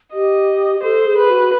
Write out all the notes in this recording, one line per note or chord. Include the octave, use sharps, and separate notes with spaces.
G4 D#5
A4 C5
G#4
B4
F#4